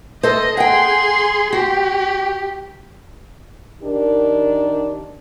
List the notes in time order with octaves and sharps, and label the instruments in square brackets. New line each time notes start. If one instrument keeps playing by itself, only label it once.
[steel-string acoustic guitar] A4 C5 [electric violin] D#5
[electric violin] G#4 C6 [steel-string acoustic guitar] F#5 G5
[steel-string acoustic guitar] F#4 [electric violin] G4
[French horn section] D#3 D4 G4 A#4